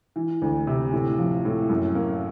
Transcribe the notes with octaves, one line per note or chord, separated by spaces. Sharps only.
E3
D2
C3
A2
F3
A2
F#2
A#3